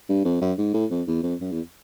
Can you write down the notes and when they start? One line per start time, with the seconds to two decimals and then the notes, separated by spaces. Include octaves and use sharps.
0.09 G2
0.25 F2
0.41 F#2
0.58 G#2
0.74 A2
0.91 F2
1.07 E2
1.23 F2
1.41 F#2
1.52 E2